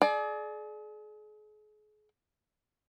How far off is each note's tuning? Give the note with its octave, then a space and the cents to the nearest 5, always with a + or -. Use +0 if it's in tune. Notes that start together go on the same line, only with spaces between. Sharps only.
G#4 +40 D5 +15